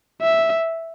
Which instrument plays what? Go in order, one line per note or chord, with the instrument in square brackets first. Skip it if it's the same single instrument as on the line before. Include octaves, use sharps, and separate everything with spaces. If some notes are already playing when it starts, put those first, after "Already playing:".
[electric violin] E5